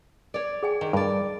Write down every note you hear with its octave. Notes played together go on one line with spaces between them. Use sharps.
C#5 D5
G#4 G5 G#5
D#3
G2 A#4 D5